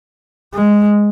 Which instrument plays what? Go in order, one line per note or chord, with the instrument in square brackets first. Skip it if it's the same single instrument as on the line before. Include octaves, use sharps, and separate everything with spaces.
[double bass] G#3